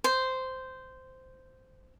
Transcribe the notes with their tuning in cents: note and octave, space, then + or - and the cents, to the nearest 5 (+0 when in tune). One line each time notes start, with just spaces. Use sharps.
C5 -10